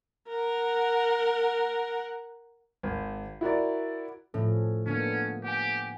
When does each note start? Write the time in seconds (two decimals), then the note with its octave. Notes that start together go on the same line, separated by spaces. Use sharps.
0.29 A#4 F#5
2.83 G#1
3.41 E4 F#4 A#4 D5
4.34 A2 F3 C#4 A4
4.86 D3 A#3 B3 C#4 D4 A4
5.44 G4 F#5 G#5